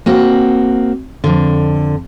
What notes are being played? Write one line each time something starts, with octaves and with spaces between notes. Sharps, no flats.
A#3 C4 F#4
F2 D3